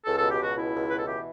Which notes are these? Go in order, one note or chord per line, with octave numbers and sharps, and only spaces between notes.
C#2 A4
B2 A4
G4
C#2 F#4
B2 E4
C#2
B2 B4
A4
E3 G4